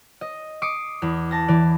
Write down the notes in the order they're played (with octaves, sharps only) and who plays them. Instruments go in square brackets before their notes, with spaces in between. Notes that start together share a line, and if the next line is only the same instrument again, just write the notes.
[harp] D#5
D6 D#6 C7 C#7
E2
A5 A#6
E3 D5